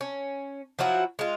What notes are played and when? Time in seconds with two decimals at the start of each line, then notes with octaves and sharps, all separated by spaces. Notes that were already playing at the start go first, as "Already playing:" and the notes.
0.01 C#4
0.79 F3 F#3 E4 F#4
1.19 G#3 F4